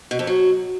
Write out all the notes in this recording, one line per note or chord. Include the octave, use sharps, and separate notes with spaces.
B2
F2
F#3